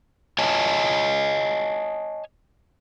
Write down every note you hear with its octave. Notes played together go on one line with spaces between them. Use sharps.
C#5 D#5 G#5 A5